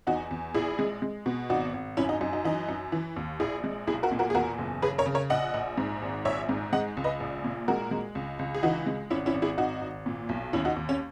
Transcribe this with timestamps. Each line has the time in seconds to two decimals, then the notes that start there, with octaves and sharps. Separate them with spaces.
0.07 E2 D#4 F#4
0.31 E2
0.54 A#1 E4 G#4
0.79 G#3
1.02 G#3
1.26 B2
1.50 G#1 D#4 F#4
1.74 G#1
1.97 F#2 C#4 E4
2.09 D#4
2.21 F#2 D#4
2.33 D#4
2.44 E3 D#4
2.69 F#2
2.92 E3
3.16 D#2
3.40 A#1 E4 G#4
3.64 G#3
3.87 B1 E4 G#4
4.03 F#4 A#4
4.11 A#2
4.19 F#4 A#4
4.30 G#4
4.35 E2 F#4 A#4
4.58 F#1
4.82 C#3 G#4 B4
4.98 A#4 C#5
5.06 C#3
5.14 A#4 C#5
5.30 A#1 D#5 F#5
5.54 A#1
5.77 G#2
6.02 G#1
6.25 A#1 C#5 E5
6.49 G#2
6.73 G#3 D#5 F#5
6.97 C#2
7.04 B4 D#5
7.20 A#1
7.44 A#2
7.68 G#3 F#4 A#4
7.91 G#3
8.15 C#2
8.39 C#2
8.55 G#4
8.63 E3 D#4 F#4
8.86 G#3
9.10 G#1 C#4 E4
9.26 C#4 E4
9.34 G#1
9.42 E4 G#4
9.58 G#1 D#4 F#4
9.82 G#1
10.06 A#2
10.29 B1
10.53 D#2 C#4 E4
10.65 D#4 F#4
10.76 D#2
10.89 C#4